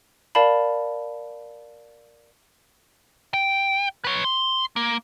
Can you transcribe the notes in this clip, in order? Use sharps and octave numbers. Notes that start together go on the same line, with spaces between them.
A#4 D5 F5 A5 B5
G5
B4 C#5
C6
A#3